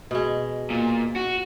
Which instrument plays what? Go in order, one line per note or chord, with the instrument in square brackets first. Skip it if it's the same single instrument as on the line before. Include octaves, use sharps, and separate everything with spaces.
[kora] B2 G#3
[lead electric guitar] A#2
F#4